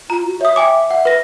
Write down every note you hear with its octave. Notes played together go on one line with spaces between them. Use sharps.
F4 A#5
F#4
C#5 E5 D#6
G5 G#5 D6
F#5
B4 A#6